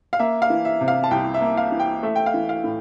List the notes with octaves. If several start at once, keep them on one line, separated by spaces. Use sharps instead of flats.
F5
A#3 E5
F5
E3
E5
C3
F5
A5
C2 G5
E5
A#3
F5
E3
G5
A3 E5
G5
F5
E3
F5
A2